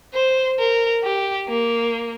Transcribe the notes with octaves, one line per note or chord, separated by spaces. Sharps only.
C5
A#4
G4
A#3